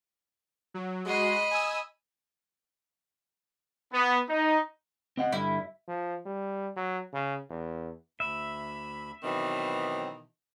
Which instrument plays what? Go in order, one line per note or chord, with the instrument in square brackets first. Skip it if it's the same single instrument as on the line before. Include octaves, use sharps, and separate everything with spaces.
[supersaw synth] F#3
[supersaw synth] G#3 F#4 C6 [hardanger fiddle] D#5 B5
[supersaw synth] G#5 D#6 E6
[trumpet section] B3
D#4
[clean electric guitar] C4 D#5 F#5
[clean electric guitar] G2 D3 G3 [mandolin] E4
[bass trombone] F3
G3
F#3
C#3
E2
[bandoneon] D2 B5 [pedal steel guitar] E5
[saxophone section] B2 D#3 E3 [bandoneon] F#3 C4